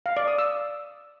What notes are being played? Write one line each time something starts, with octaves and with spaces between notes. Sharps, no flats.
F5
D5
D#6
E6